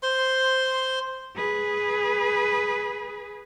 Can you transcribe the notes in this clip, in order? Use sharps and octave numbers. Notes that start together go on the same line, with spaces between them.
C5 C6
G#4 B4